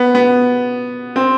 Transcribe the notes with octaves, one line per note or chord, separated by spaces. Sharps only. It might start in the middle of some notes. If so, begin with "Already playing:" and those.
Already playing: B3
B3
C4